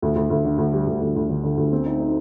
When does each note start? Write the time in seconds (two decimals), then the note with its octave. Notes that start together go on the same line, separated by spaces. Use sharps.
0.02 D2
0.16 D2
0.30 D2
0.45 D3
0.58 D2
0.73 G3
0.87 D2
1.02 D2
1.16 D2
1.29 D3
1.43 D3
1.57 D2
1.73 C4
1.86 D#4
2.00 D#4